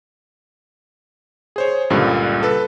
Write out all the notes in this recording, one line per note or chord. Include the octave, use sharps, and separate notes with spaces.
G#4 C5 C#5
C#2 G2 A#2 D3 G3
A4 B4